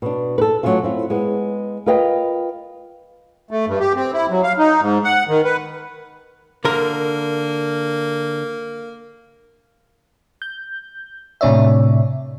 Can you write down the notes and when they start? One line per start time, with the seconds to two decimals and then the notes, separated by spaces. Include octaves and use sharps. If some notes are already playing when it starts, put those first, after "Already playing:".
0.02 B2 D4
0.38 A4 B4
0.63 F#3 G#3 A3 C#4 F4
0.83 C4 E4 F4
1.10 G#3 B3
1.86 F4 A#4 B4 D#5 F5 G5
3.51 A3
3.67 G2
3.80 G4
3.96 C4
4.13 E4
4.30 F#3
4.43 F5
4.58 D#4
4.81 G#2
5.04 F#5
5.28 D#3
5.44 B4
6.65 D3 A#3 A#4
10.42 G6
11.41 A2 C3 D4 C#5 D5 E5